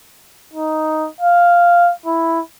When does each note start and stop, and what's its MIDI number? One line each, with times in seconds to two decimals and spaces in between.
0.53 1.08 63
1.21 1.92 77
2.06 2.40 64